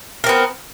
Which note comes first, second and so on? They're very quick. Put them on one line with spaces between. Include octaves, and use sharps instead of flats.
A#4 C4 B3